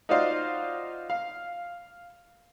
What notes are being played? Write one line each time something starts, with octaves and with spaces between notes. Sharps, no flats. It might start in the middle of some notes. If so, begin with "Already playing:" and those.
D#4 F4 F#4 C5 D5 F5
F5